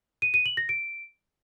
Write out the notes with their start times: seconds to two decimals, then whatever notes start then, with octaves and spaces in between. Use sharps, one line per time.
0.22 D#7
0.34 D#7
0.46 F#7
0.57 A#6
0.69 D7